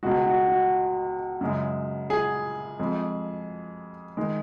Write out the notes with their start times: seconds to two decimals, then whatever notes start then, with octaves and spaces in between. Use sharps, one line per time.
0.03 C#2 B2 G#3 F#4
0.26 F#4
0.49 F#4
1.41 F#2 C#3 G#3
2.10 G#4
2.79 F2 F3 G#3
4.17 D#3 G#3